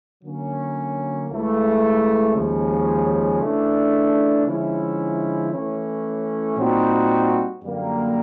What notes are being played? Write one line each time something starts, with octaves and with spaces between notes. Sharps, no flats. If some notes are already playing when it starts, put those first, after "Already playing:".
D3 F#3 A#3 C#4
C#2 C#3 E3 A3
D#2 C#3 F3 G#3 C#4
C#3 E3 A3 D4
D3 F3 G#3 C#4 E4
E3 A3 C#4
A#2 G3 C4 D#4 F#4
F#2 D3 G3 A#3